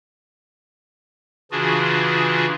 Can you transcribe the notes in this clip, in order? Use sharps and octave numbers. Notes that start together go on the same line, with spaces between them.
C#3 E3 D4 F4 F#4 G#4